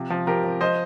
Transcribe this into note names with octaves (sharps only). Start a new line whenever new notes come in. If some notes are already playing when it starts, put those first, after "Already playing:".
Already playing: C3 F3
F3
F3 G4 A#4
F3
F3 C5 D#5